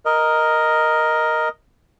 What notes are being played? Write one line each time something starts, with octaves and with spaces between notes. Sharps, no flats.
A#4 D#5